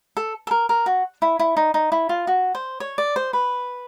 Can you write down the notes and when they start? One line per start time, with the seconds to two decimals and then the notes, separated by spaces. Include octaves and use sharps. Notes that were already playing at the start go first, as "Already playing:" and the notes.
0.17 A4
0.47 A4
0.51 A#4
0.69 A#4
0.86 F#4
1.22 E4
1.39 E4
1.57 D#4
1.74 D#4
1.92 E4
2.09 F4
2.27 F#4
2.55 C5
2.80 C#5
2.98 D5
3.16 C5
3.33 B4